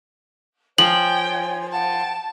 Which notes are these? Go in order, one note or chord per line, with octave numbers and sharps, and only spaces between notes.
F3 C#5 G5 G#5 F#7
F#5 G5 A5